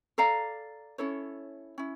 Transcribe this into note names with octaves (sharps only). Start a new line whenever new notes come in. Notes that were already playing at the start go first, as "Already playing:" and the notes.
A4 D5 F5 A#5
C#4 E4 A4 C#5
C#4 E4